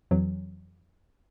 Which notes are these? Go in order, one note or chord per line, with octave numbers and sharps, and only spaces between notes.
F2 E3 F#3